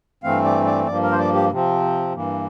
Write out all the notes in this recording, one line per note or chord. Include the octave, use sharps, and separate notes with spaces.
G2 E3 A3 C4 F5
D5
D5
G2 F3 A#3 D5
A#4
C5
D5
G4
C3 F3 C4
G2 E3 A#3